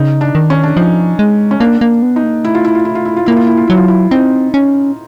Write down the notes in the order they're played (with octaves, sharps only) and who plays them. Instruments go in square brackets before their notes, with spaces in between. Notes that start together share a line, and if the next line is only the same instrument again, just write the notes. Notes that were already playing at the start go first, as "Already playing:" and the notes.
Already playing: [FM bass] C#3 [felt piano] D#4
[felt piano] D4
[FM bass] D#3
[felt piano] C#4
D4
[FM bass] F3 [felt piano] D#4
[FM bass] G#3
[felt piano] C#4
[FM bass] A#3 [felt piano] D4
[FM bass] A#3
B3
[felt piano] D#4
[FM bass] A#3
[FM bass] A3 [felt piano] E4
[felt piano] F4
E4
F4
E4
F4
E4
F4
[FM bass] A#3 [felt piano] E4
[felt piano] F4
E4
F4
[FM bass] F#3 [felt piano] E4
[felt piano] F4
E4
[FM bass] C4 [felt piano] D#4
[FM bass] C#4